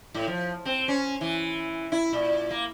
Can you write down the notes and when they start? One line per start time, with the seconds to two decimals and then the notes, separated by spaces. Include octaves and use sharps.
0.14 A2
0.27 F3
0.65 C4
0.88 C#4
1.21 E3
1.92 E4
2.13 A#2
2.50 A#3